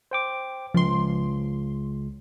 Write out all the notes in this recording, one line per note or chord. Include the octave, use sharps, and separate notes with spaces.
C5 G5 D6
C#2 F3 C6